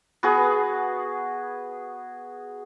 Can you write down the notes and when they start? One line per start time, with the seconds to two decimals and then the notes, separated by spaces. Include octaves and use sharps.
0.23 B3 F#4 G#4 B4